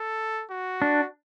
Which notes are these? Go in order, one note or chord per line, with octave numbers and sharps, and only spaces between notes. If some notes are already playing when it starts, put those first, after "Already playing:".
Already playing: A4
F#4
D4